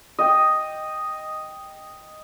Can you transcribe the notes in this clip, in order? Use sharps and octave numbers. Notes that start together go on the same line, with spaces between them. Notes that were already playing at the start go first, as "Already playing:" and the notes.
D#5 G5